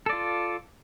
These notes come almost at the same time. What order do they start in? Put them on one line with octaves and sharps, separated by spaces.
A4 D5 F4